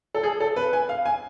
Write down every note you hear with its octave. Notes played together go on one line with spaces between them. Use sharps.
A4
G#4
A4
B4
G#5
F5
G#5